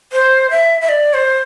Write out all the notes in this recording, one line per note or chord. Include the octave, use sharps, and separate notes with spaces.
C5
E5
E5
D5
C5